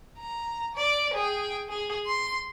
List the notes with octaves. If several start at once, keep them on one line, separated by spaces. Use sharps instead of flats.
A#5
D5
G#4 G5
G#4
C6